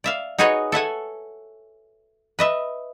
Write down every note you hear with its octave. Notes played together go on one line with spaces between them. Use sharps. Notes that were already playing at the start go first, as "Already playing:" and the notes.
D5 E5 F5
D#4 F#4 G#4 B4 C#5 D#5
A4 E5 F#5 G#5
B4 D#5 E5